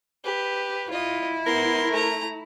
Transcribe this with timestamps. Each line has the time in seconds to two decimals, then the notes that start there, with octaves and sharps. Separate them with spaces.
0.25 G4 B4
0.90 E4 F4 D#5
1.46 B3 A#4 C6
1.90 A3 A#5